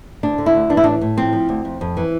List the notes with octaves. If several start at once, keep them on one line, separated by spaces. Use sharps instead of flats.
D2 D4
D3
E4
D2
E3 D4
E4
A2 D4
A2
F3 C4
F3
D2
F2
F2
E3